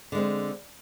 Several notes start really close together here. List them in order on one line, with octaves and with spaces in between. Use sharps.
D3 G#3 C4